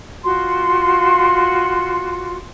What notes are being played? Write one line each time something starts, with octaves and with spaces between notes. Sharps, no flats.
F4 F#4 C6